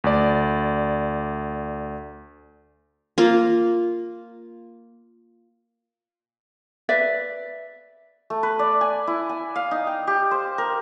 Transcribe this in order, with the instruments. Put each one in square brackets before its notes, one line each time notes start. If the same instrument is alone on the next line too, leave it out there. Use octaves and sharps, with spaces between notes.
[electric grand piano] D2 D5
[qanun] A#3 F4
[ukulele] B4 D5 E5
[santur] A3
B4
D5
G#5
E4
G#5
F5
D#4
G5
G4
C5
A#4